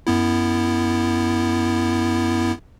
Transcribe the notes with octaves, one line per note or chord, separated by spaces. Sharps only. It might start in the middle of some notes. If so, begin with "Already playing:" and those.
F#2 B3 E4